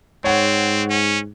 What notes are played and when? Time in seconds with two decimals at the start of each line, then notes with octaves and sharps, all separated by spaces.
0.24 G#2 C4 C#5 F#5
0.90 C#4